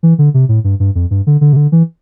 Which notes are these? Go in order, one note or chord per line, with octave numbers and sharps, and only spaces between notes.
E3
D3
C3
A2
G2
G2
F2
G2
D3
D3
C3
D3
E3